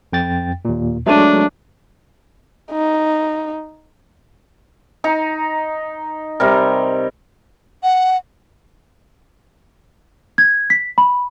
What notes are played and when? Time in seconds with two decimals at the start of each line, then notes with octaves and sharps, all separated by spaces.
0.13 F2 G5 A6
0.65 D#2 A#2
1.07 F#3 G#3 A3 D4 E5 A5 D#7
2.72 D#4
5.04 D#4 A#5
6.40 C3 G3 A#4
7.83 F#5
10.38 G#6
10.70 B6
10.98 B5